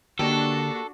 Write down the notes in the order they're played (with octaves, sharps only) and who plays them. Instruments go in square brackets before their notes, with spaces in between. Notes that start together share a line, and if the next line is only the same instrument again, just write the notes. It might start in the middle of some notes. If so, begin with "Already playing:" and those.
[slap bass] D3 [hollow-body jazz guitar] A#3 G4 [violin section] D4 F#4 [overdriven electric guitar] A4